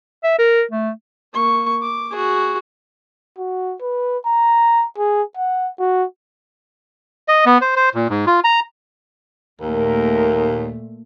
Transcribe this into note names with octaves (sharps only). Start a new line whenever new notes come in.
E5
A#4
A3
A#3 C#6
D6
F#4 G#4
F#4
B4
A#5
G#4
F#5
F#4
D#5
B3
C5
C5
A#2
G#2
F4
A#5
D#2 A#2 A3 A#4